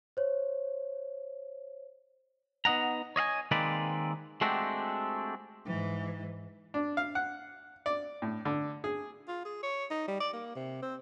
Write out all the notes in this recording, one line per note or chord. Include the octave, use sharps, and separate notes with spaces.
C5 C#5
B3 D#4 D#5 F#5 A#5
C#5 D#5 F5 G#5
D#3 G#3 A#3 C4 B4 D5
G#3 A3 C4 D4 F#4 G4
G#2 E3
D4
F5
F#5
D5
A2
D3
G#4
F4
G#4
C#5
D#4
G3
D5
A#3
C3
C4